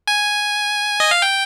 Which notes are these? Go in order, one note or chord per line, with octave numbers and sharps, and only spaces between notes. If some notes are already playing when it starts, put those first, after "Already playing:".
G#5
D#5
F5
G5